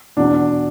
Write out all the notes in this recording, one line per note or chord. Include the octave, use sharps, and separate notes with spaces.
E2 B2 D4